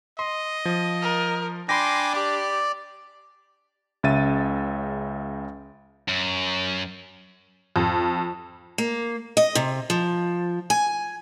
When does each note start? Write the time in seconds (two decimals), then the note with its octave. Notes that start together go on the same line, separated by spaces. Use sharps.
0.19 D#5 C6
0.65 F3
1.02 A#4
1.69 D4 G5 G#5 B5 C6 D6 A#6
2.13 G4 D5
4.03 C#2 C#3 E5 A6 D#7
6.08 F#2
7.76 F2
8.78 A#3
9.37 D#5
9.55 C3
9.90 F3
10.70 G#5